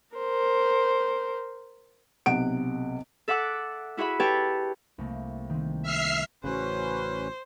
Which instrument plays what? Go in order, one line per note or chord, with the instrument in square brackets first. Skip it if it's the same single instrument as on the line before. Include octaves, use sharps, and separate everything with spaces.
[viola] A#4 C5
[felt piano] B1 C3 F#5 D7
[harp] A4 E5 F#5 D6 E6 F#6
E4 F#4 G#4 E5 B5
G4 A4 B4 C#5 G5 A5
C2 A3 A#3
D#3 C4
[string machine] E5 F6 C7
[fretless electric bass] A1 C#3 [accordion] C#4 B4 [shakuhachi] F#4 [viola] C5